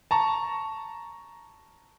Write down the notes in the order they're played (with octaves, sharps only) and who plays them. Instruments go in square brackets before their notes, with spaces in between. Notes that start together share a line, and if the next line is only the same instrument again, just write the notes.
[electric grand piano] A5 A#5 C#6